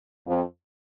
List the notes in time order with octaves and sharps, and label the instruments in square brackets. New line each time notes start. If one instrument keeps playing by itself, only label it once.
[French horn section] F2